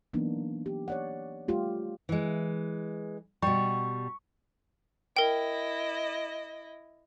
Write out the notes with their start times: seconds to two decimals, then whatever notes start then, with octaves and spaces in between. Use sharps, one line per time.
0.13 E3 F#3 A#3 B3 D4 D#4
0.66 G4
0.88 C#5 D5 F#5
1.48 G3 A3 F4 G4
2.09 E3 G#3
3.42 B2 G3 C#6
5.17 E4 A#4 D#5 G5